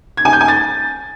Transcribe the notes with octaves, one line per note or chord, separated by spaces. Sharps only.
G#6
G#5
G6
G#5
A6